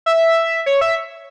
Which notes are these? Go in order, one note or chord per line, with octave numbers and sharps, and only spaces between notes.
E5
C#5
E5